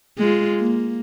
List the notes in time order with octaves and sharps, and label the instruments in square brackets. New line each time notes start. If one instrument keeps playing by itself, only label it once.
[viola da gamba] G#3 F4
A#3